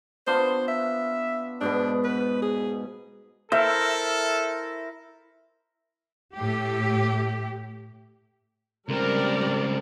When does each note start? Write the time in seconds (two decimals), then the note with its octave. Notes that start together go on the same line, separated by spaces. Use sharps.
0.27 B3 D4 F4 C5
0.68 E5
1.61 G#2 B2 B3 D4
2.04 B4
2.42 G#4
3.52 E4 A4 A#4 C5 E5
6.34 A2 G4
8.89 C#2 G3 C4 A#4 D5